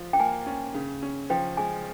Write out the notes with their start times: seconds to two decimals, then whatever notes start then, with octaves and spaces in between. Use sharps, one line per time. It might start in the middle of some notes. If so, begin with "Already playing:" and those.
Already playing: F3 F4
0.13 G5
0.20 A#3 G#5
0.46 C#4
0.74 C#3
1.02 C#4
1.30 F3 G5
1.57 G#3 G#5